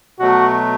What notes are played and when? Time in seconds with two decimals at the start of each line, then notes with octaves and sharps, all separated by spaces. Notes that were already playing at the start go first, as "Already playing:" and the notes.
0.19 B2 F#3 A3 F#4